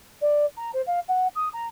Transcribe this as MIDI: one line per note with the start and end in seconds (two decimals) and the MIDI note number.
0.21 0.45 74
0.57 0.70 82
0.73 0.81 72
0.86 0.99 77
1.08 1.27 78
1.35 1.49 87
1.53 1.66 82